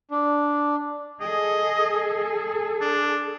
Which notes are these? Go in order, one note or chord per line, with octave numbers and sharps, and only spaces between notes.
D4
G#4 A4 D#5
D4